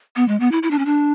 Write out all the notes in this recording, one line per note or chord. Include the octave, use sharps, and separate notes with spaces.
B3
G#3
B3
E4
E4
D4
C#4
D4